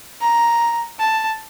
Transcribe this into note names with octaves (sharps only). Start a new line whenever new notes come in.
A#5
A5